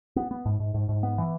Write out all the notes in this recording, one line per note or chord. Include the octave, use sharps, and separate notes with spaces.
B3
B3
G#2
G#2
G#2
G#2
B3
E3